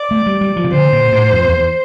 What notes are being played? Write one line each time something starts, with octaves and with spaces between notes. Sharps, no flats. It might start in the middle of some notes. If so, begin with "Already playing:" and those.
Already playing: D5
A3
G3
G3
F3
C3
D3 C5
A#2
A2
F2
E2